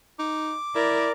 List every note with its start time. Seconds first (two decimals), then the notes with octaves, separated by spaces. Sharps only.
0.19 D#4 D6
0.75 E4 A#4 D5